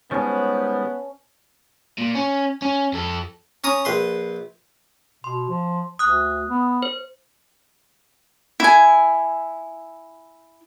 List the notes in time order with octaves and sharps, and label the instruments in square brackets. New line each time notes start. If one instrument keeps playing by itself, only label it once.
[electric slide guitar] D#3 G3 G#3 [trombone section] B3 [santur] C#4 A5 [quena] C5
[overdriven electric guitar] A#2
C#4
C#4
F2 A4
[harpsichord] C#4 A#5 D#6
A#1 B4 C6
[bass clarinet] B2 [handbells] C6
[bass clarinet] F3
[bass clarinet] D2 [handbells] D#6 F#6
[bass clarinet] B3
[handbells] C5
[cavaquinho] E4 G#5